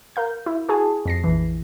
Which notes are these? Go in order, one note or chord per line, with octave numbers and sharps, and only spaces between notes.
A#4 F5 G6
E4
F#4 G#4 G#5 A5
F2 A#6 C7
A#1 E3